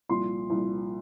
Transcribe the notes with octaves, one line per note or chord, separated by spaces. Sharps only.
C2 A#2 F3 C6
C2 A#2 F3